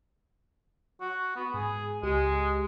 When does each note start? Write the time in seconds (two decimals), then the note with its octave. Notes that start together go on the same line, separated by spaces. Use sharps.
1.01 F#4
1.36 B3
1.54 G#2 G#4
2.03 C#2 G#3 G4